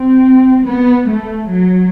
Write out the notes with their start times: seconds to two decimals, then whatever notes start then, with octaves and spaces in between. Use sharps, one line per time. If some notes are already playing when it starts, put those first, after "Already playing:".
Already playing: C4
0.68 B3
1.09 A3
1.49 F#3